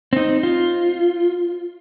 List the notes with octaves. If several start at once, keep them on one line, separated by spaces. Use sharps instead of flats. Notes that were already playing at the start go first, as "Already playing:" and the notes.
C4 D#4
F4